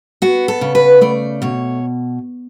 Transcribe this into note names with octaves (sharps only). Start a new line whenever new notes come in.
B3 F#4
A4
C#3
B4
A3 D5
B2 C#5